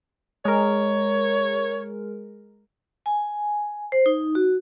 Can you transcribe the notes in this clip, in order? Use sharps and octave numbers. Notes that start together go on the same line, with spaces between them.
G#3 A#4 C#5
G#5
C5
D#4
F#4